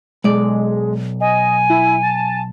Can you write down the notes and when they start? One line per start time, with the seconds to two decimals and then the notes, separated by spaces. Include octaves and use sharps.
0.24 B1 G#3 D5
1.21 D#5 G#5
1.70 E4
2.03 A5